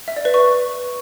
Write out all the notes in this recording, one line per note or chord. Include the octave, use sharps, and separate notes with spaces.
E5
D5
B4
C#6